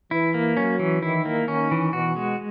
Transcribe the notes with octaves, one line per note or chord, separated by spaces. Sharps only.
E3 E4
A#3
F#3 C#4
E3
D#3 E4
A#3
D#3 C#4
E3
B2 F#4
G#3